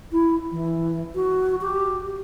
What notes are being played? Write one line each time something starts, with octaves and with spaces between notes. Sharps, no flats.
E4
E3
F#4
G4